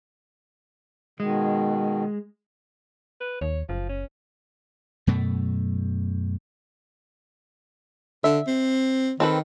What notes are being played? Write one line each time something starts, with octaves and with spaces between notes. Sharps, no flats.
B2 D#3 G#3
B4
D#2 C#5
F#1 F3
C#4
F#2 B2 A3
D3 E5
C4
D#3 C4 A4 B4